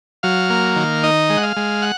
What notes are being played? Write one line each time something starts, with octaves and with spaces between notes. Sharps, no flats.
F#3 F5
A#3
D#3
D#4 D#5
G#3
F#5
F5
G#3
F#5